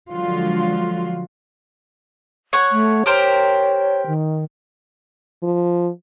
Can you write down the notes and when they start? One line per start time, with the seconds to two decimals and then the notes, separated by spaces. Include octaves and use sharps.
0.11 D3 F3 F#3 G#3 F4 F#4
2.53 C#5 F#5 C#6
2.72 A3
3.06 G4 A#4 C5 C#5
4.07 D#3
5.43 F3